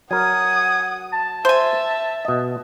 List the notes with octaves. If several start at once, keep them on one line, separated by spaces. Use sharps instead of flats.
F#3 A#4 F#5 G#5 D#6
A5
C5 E5 G#5
B2 D#5